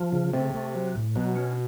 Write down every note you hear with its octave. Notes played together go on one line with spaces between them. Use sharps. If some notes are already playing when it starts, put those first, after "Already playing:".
Already playing: F3
C#3
C3 A3
A3
F#3
A2
B2 F#3
C#4